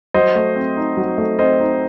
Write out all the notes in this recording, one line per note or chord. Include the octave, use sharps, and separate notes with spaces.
F#3 C5 D#5
A3
C4
D#4
F#3
A3
C4 C5 D#5
D#4